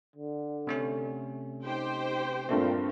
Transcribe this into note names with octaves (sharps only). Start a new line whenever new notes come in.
D3
C3 A3 C#4
D#4 G4 C5 G5
G2 A#2 A3 C4